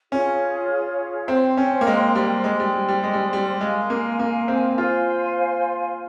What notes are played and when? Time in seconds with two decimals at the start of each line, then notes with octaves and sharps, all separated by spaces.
0.11 C#4 F4 G#4 C#5
1.28 C4 C5 G5 C6
1.57 C#4
1.81 A#3
1.87 G#3
2.15 G3
2.44 G#3 C5 G5 C6
2.60 G3
2.74 G3
2.89 G3
3.03 G#3
3.13 G3
3.33 G3
3.61 G#3 A#4 F5 G#5 C6
3.90 A#3
4.19 A#3
4.48 C4
4.77 F4 C5 F5 G#5 C6